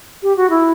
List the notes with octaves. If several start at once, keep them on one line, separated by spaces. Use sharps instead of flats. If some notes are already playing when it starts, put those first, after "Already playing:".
G4
F#4
E4